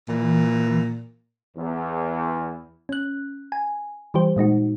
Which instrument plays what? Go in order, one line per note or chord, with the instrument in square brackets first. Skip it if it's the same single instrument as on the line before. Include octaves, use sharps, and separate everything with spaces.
[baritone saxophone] A#2 [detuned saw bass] E3
[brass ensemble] E2
[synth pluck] C#4 F#6
G#5
E3 G3 G4 C5
A#2 G#3 D#4 F#4